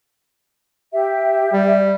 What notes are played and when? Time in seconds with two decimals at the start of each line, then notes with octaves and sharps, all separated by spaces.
0.93 G4 E5
1.53 G3